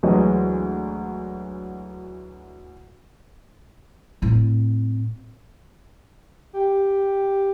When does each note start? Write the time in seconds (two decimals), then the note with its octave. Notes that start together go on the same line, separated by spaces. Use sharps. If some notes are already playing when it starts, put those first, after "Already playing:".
0.03 D2 E3 F#3 G#3 D#5
4.22 A2 C4
6.53 G4